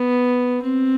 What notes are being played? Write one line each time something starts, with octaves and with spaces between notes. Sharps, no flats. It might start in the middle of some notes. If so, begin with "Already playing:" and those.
Already playing: B3
C4